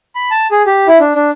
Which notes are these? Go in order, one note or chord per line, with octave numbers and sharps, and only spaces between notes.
B5
A5
G#4
G4
E4
D4
D4